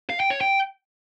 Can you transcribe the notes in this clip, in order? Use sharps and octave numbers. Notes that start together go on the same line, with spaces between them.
F5
G5
C#5
G5